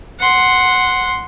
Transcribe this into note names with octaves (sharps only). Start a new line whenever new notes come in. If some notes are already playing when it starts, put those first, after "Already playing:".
F#5 C6